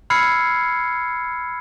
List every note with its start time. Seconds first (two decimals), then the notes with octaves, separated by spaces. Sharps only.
0.10 B5 E6 F6 G#6 C7 C#7